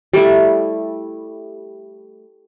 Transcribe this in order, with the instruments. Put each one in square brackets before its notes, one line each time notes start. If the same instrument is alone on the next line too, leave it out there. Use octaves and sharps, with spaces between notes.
[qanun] G3 A3 E4